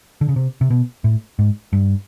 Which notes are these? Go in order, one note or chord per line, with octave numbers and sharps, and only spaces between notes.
D3
C#3
C3
C3
B2
A2
G#2
G2